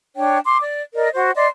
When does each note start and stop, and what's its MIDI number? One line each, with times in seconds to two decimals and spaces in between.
0.16 0.38 62
0.16 0.38 73
0.16 0.38 79
0.44 0.58 84
0.44 0.58 86
0.62 0.82 74
0.95 1.09 70
0.95 1.09 74
0.95 1.09 75
1.14 1.31 66
1.14 1.31 72
1.14 1.31 78
1.35 1.47 74
1.35 1.47 75
1.35 1.47 84